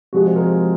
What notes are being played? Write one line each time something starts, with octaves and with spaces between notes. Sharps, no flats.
C3 F3 G#3 F#4
C5
A#4
G#4